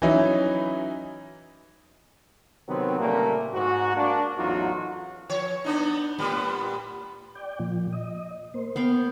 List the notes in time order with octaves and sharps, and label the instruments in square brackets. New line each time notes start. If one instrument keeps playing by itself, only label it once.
[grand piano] E3 F#3 C#4 D#4 E4
[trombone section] C3 D#3 F#3 B3 C4
A#2 C#3 G3 A3 A#3
G#2 F#4
A#3 D4
A1 E2 F#3 D#4 F4 F#4
[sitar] F3 C#5
B3 D4 D#4
A2 G3 B3
[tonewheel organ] D5 G5
A#2 F3
D#5
A#3 C5
[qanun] B3 F5 G5